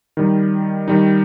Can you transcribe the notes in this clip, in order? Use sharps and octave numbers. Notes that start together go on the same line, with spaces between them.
D#3 G3 D#4
D#3 G3 D#4